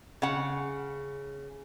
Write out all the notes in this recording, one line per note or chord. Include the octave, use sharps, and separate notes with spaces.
C#3 F#5